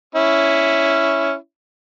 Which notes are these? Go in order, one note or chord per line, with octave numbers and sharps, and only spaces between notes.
C#4 E4